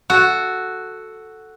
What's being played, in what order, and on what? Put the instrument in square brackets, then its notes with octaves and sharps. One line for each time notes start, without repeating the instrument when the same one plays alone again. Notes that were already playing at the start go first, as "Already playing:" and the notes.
[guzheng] F#4 A4